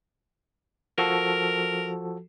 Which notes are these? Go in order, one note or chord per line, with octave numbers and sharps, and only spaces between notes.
F3 F#4 A4 A#4